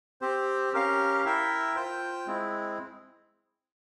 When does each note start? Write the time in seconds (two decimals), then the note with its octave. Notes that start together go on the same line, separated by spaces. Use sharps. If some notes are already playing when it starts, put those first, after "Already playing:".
0.21 C4 G4 C5
0.73 C#4 G4 A#4 F5
1.25 E4 A#4 E5 G5
1.75 F4 C5 G5
2.27 G#3 C4 E4